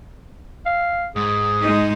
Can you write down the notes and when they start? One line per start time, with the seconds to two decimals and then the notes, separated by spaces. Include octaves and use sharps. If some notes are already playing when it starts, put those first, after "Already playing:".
0.66 F5
1.16 G#2 G#4
1.61 G#3 D#4